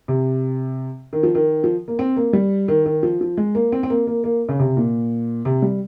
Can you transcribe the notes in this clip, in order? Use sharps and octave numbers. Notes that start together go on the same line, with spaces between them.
C3
D#3
F3
D#3
F3
A#3
C4
A#3
G3
D#3
D#3
F3
F3
G#3
A#3
C4
C4
A#3
A#3
A#3
C#3
C3
A#2
C3
G3